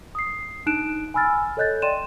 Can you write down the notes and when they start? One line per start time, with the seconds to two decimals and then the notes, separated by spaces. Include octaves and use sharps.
0.15 D#6 C7
0.66 D4 D#4 F#6 D7 E7
1.14 G#5 B5 E6 F6 A6
1.57 A4 C#5 D#5 F#6 G6 A6
1.82 D5 G5 C6 D#7 E7